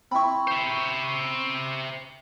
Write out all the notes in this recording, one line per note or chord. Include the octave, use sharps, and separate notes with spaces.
C4 E4 B5 C#6
C5 E5